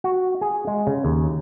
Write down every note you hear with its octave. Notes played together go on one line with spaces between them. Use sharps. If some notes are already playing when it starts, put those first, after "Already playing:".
F#4
G#4
G#3
C#3
D#2